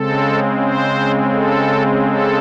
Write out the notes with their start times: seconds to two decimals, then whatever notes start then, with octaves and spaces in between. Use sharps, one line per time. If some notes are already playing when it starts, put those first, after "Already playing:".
Already playing: C#3 G#3 C4 A4
0.61 C5
1.33 A4
2.05 A4